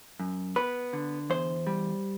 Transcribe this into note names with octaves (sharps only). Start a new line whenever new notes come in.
F#2
B3 B4
D3
E2 C5
G3